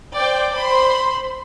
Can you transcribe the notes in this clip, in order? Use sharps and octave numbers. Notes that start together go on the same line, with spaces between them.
C5 D5 G5 D6
C5 B5 C6